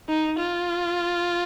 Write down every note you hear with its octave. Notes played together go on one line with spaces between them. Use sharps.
D#4
F4